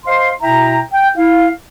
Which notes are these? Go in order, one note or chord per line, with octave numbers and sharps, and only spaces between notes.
C5 D#5 F5 C6
B2 E4 E5 G5 A#5
G5
E4 F5